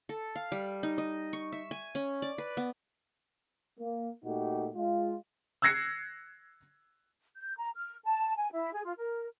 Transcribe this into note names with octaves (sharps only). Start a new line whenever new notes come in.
A4
F5
G3
D#4
D#5
C#6
E5
G#5
C#4
D5
B4
B3
A#3
A#2 A3 D#4 F#4 G4
G#3 F4
E6 F#6 G#6 A#6 C7 C#7
G6
A#5
F6
A5
G#5
E4
G#4
F4
A#4